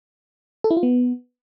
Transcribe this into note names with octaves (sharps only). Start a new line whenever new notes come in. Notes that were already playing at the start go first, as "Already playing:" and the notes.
A4
E4
F4
B3